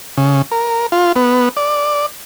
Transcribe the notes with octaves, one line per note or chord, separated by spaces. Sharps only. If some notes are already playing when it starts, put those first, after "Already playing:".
C#3
A#4
F4
B3
D5